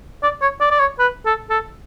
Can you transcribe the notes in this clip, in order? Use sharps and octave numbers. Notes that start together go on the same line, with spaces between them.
D5
C#5
D5
D5
C#5
B4
A4
A4